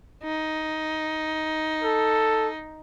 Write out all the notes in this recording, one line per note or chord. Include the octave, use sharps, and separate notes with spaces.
D#4
A4